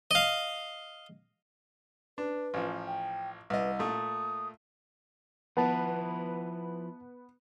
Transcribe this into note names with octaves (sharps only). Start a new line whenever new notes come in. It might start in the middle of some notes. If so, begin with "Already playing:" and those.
D#5 F5
D4 B4
A1 F3
G5
C2 B4 D#5
A#2 A3 D#6
F3 B3 E4 F#5 A5